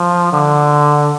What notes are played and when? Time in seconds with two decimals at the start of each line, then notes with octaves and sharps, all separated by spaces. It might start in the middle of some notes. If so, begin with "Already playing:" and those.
Already playing: F3
0.33 D3